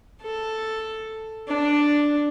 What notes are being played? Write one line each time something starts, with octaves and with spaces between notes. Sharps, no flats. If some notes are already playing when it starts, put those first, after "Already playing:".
A4
D4